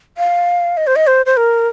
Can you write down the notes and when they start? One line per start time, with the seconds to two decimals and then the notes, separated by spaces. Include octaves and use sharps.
0.18 F5
0.77 D#5
0.87 C5
0.96 D#5
1.07 C5
1.26 C5
1.37 A#4